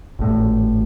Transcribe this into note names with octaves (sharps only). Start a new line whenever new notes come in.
G#1 A2